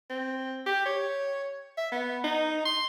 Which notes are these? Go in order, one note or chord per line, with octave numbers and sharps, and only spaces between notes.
C4
G4
C#5
E5
B3
D#4
C6